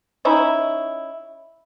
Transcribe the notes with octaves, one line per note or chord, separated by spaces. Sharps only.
C#4 D#4 E4